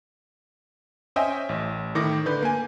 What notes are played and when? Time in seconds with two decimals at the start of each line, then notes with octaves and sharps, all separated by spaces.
1.16 C#4 C5 D#5 E5 G5 G#5
1.49 A1
1.95 A2 D#3 D6 A#6
2.26 D3 B4 G6
2.42 A#3 G#5